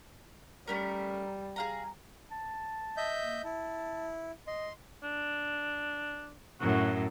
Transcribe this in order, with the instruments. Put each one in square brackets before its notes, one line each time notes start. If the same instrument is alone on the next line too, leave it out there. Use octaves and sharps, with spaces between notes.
[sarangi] G3 [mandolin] A3 C#4 A#4
[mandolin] G#4 F5 A#5
[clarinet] A5
[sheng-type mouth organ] D#5 E5 G6
[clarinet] A#3
[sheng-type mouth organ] E4 [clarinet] A5
[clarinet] D#5 [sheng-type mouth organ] C6
[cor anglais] D4
[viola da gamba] F#2 A2 [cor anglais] F#4